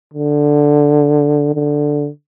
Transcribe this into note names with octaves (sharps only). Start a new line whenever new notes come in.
D3
D3